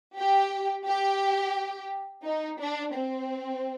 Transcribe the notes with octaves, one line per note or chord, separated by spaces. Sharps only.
G4
G4
D#4
D4
C4